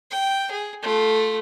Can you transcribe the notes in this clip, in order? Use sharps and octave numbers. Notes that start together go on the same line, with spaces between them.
G5
G#4
A3 F4